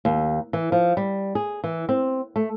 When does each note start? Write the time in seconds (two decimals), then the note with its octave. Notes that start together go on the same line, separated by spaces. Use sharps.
0.05 D#2
0.53 E3
0.72 F3
0.97 G3
1.35 G#4
1.64 E3
1.89 C4
2.36 A3